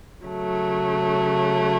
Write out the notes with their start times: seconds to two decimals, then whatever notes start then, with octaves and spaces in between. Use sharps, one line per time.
0.23 C#3 F#3 A3